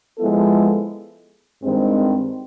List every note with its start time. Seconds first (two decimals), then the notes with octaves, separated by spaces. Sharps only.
0.18 F3 G#3 B3 E4 A4
1.63 G2 D#3 G#3 C4